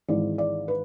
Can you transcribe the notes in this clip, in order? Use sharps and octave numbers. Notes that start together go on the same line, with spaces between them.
G#1 G#2 E3 G#3 D5
D5
B4